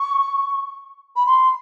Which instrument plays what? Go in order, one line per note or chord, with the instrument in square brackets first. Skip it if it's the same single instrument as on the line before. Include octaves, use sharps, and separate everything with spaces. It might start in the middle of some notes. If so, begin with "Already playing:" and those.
Already playing: [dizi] C#6
B5
C6